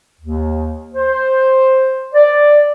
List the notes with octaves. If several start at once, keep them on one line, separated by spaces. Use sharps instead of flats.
D#2
C5
D5